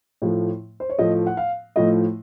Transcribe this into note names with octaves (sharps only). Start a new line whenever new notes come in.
A2 F3 A3
C5
C#5
A2 F3 A3 D#5
F#5
F5
A2 F3 A3 D#5